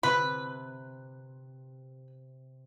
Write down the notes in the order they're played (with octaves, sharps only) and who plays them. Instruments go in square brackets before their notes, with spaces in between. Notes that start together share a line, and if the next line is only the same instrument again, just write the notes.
[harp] C3 [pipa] B4